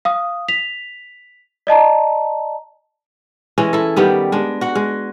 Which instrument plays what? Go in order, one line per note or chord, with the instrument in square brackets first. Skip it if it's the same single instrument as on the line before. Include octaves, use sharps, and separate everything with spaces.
[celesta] F5 D#6
B6 F7
D5 D#5 A5 A#5
[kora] E3 G#3 C#4
E4 A4
D#3 G3 B3 G4
G#3 D4
F#4 F#5
G#3